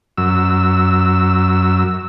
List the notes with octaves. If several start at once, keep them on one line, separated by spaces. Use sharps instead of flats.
F#2 E6